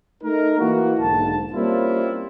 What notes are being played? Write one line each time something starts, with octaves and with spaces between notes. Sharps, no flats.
A3 D#4 A#4
E3 A#3 E4 F#4
B1 G#2 D3 A#3 A5
G3 A#3 C4 C#4 E4 F4